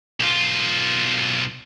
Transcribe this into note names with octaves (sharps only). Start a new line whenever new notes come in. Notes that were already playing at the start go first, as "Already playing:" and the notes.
B1 F4